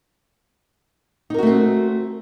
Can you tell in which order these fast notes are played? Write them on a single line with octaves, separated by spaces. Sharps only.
D#4 A#4 F#4 A3 C4